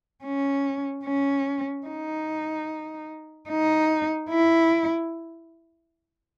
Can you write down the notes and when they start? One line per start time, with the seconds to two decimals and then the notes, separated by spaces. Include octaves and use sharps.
0.24 C#4
1.05 C#4
1.87 D#4
3.49 D#4
4.31 E4